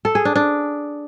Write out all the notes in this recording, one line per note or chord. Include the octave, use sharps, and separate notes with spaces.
A4
G#4
D4
D4